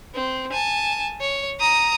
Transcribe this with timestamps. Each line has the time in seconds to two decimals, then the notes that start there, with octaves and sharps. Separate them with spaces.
0.15 C4
0.53 G#5 A5
1.21 C#5
1.60 A#5 D#6